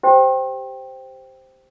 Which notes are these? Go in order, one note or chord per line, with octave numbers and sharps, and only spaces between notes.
G4 C5 G5